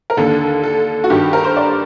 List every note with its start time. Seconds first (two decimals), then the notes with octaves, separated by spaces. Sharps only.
0.10 A#4
0.17 D#2 D3 A4
0.63 A4
1.04 F#4
1.10 G2 D#3 G4
1.33 A#4
1.45 C5
1.57 D5